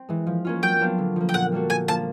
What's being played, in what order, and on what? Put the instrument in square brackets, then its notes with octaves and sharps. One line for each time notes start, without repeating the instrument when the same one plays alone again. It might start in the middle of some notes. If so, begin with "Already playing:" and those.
Already playing: [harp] C4
E3 G#3
F3
A#3 C#4 F4
[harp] F#3 [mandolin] G5
[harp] B3 D4 F4
D3
F3 A#3
[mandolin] G5
[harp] A#2 [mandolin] F#5
[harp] G3 A#3 D4 F#4
[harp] A#2 [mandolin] G#5
[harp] F3 A#3 D4 [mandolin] A5